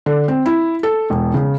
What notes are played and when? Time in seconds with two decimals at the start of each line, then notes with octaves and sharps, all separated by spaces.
0.06 D3
0.28 C4
0.46 E4
0.83 A4
1.10 E1
1.34 C#3